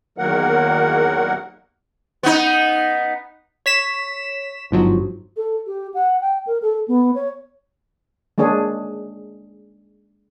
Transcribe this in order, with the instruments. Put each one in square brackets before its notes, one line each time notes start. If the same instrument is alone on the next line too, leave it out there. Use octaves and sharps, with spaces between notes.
[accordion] E2 D#3 F#3 A#3 A#4 F#5
[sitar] B3 D#4
[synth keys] C#5 B6 E7
G1 G#2 F3 F#3
[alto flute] A4
G4
F#5
G5
A#4
A4
B3
C#5
[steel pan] G#3 A#3 D4 G#4 C#5